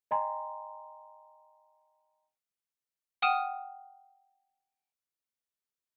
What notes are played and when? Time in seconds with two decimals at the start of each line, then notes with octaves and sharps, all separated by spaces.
0.11 D#5 G5 G#5 A#5 C6
3.22 F#5 G5 D#6 F6 D#7 E7